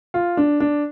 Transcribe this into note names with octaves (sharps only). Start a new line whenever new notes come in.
F4
D4
D4